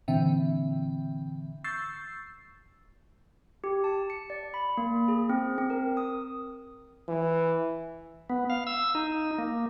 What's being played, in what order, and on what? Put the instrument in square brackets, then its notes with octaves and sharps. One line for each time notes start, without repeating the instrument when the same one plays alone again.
[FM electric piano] A#2 D3 E3 C4 E5 G5
C#6 E6 G6 A6 C7
[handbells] G4
A5
C#7
D5
B5
A#3
G#4
C4
C4
A#4
D#6
[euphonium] E3
[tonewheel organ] B3
F5
E6
D#4
A#3